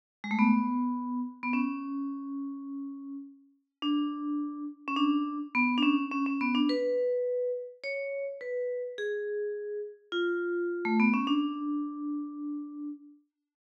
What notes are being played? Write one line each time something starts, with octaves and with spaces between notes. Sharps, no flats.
G#3
A3
B3
B3
C#4
D4
C#4
D4
B3
D4
C#4
C#4
C#4
B3
D4
B4
C#5
B4
G#4
F4
A3
B3
C#4
D4